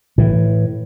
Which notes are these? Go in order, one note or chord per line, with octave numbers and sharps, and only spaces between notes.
A2 E3